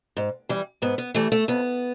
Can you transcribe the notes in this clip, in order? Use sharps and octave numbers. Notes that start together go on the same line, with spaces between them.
G#2
E3 G3
G#2 B3
B3
E3 G3 A3
A3
F2 B3